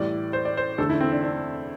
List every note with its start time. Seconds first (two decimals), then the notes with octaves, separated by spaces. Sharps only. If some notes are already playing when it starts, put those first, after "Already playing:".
Already playing: A2 E3 G3 D5
0.33 C5
0.45 D5
0.57 C5
0.78 E2 D3 A3 A4
0.90 E4
1.01 C4
1.12 D4
1.23 D4